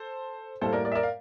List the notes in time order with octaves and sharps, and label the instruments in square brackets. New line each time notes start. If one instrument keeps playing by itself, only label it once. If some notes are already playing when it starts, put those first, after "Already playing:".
Already playing: [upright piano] A4 C5
A2 G3 A#3 A4 C5
A#4 D5
A#4 D5
E5
A#4 D5
F5